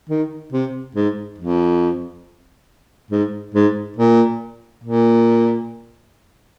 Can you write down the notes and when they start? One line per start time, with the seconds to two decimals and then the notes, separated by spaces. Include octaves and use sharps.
0.09 D#3
0.52 C3
0.95 G#2
1.38 F2
3.11 G#2
3.54 G#2
3.97 A#2
4.83 A#2